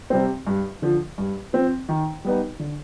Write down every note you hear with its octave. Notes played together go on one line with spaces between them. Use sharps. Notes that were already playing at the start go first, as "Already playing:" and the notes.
C3 G3 C4
G2
D3 F3
G2
F3 C4
D#3
G3 B3 D#4
D3